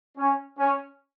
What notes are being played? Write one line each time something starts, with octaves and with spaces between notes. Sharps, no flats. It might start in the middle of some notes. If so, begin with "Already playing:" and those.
C#4
C#4